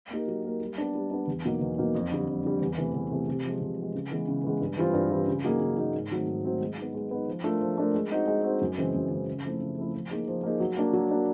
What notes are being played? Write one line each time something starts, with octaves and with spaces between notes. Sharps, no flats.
A#3 D#4 G4 A#4
F#3
A#3 D#4 G4 A#4
G3
B3 D4
G3
B3 D4
E2
B2 F#3 A#3 D#4
E2
B2 F#3 A#3 D#4
F2
D3 G3
F2
D3 G3
E2
C3 E3 A3
E2
C3 E3 A3
C3
F3 G#3
C3
F3
G#3
C#3
E3 G#3 B3
C#3
E3 G#3 B3
G2
E3 G3 C4 F4
G2
E3 G3 C4 F4
C#3
F#3 A#3 D#4 G#4
C#3
F#3 A#3 D#4 G#4
G#2
D#3 F#3 A3 C4
G#2
D#3 F#3 A3 C4
G#3
B3 D#4
G#3
B3 D#4
F3
A3 D4 F4 A#4
F3
A3 D4 F4 A#4
G#3
C4 D#4 F#4
G#3
C4 D#4 F#4
F#2
C#3 E3 G#3 C4
F#2
C#3 E3 G#3 C4
C#3
F3 A3 C4 E4
C#3
F3 A3 C4 E4
F3
A#3 D#4 G#4
F3
A#3 D#4 G#4
F#3
A#3 D4 F#4
F#3
A#3 D4 F#4